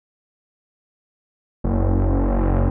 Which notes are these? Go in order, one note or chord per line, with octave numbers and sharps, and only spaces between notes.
F#1